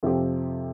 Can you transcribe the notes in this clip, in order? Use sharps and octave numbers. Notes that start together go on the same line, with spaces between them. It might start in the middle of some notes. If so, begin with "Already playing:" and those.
F2 C3 F3 C4 G4